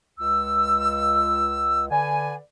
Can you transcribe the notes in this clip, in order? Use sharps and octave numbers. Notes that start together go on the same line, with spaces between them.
C#2 E6
D3 B4 D5 G#5